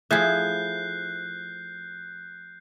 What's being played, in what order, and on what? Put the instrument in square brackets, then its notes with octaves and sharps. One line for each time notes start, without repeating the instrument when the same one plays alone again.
[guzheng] F3 A3 [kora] E4 G#4 E5 [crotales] F#6 G6 C7